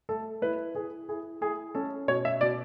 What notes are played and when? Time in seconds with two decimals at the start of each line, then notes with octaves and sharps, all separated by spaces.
0.09 A3 A4
0.42 E4 B4
0.75 E4 G#4
1.08 E4 G#4
1.41 E4 G#4
1.75 C#4 A4
2.08 B2 C#5
2.25 E5
2.41 B2 D5